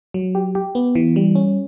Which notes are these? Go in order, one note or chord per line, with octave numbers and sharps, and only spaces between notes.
F#3
G4
G4
B3
E3
G3
C#4